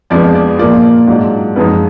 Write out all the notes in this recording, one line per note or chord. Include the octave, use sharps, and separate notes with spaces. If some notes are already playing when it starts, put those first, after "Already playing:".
F2 F3 G#3 B3 D4 D5
D5
A#2 F3 A#3 F4 D5
G#2 F#3 D4 F4
F#2 F3 G#3 D#4 B4